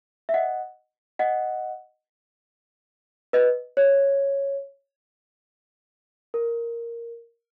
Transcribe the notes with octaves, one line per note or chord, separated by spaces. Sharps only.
E5
D#5 F#5
D#5 F#5
B4 D#5
C#5
A#4